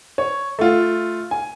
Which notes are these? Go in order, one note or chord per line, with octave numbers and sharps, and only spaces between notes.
C#5
A3 F4
G#5